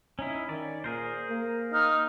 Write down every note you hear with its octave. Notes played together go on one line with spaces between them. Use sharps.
C#4 D#4 E4
D#3 C#4 D5
A#2 G#4 A#4 C5
A#3
D#4 F6